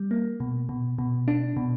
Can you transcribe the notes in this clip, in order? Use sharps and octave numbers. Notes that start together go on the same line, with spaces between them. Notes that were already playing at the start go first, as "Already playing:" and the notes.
Already playing: G3
A#3
B2
B2
B2
D4
B2